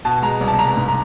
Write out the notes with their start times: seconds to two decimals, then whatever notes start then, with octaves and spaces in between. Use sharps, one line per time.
0.05 B2 A5
0.22 G#3 A#5
0.41 C2
0.48 A5
0.58 C2 A#5
0.76 G#2
0.88 A#5